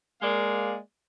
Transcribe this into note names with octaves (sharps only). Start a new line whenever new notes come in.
G#3 A#3 D5 F5